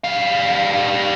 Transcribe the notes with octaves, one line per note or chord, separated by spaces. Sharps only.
G3 F5